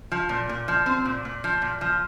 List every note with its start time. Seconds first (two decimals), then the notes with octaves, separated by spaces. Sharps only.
0.12 F3
0.29 A#2
0.49 A#2
0.68 F3
0.86 C4
1.05 A#2
1.25 A#2
1.44 F3
1.62 A#2
1.81 F3